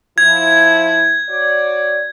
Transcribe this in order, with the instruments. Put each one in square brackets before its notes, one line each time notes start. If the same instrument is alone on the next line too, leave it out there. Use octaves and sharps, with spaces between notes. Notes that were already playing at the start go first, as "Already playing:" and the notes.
[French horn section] F3 E4 [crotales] G#6
[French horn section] F#4 C#5 D5